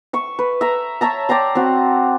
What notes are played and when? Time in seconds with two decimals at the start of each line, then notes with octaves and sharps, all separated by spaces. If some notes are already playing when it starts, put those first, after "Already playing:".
0.13 E5 C#6
0.39 B4
0.61 E5 A#5
1.01 C#5 E5 A5 A#5
1.29 D5 G5 A#5 C6
1.55 C4 F#4